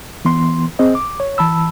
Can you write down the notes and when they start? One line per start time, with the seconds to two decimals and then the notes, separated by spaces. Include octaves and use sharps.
0.25 E3 B3 C6
0.79 C4 G#4 C5 D#5
0.95 D6
1.20 C#5
1.38 E3 A5 B5 E6